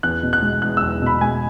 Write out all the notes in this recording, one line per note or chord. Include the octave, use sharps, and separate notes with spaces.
E2 F#6
B2
F#6
G#3
E2 F#6
E2 E6
B2 B5
G#3 G#5